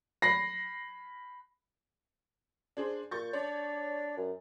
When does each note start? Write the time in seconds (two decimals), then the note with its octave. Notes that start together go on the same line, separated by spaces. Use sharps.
0.22 B5 A#6 C7
2.77 D4 G#4 C5
3.11 A#2 C#6 G6 A6
3.33 D4 C#5 D5
4.17 F#2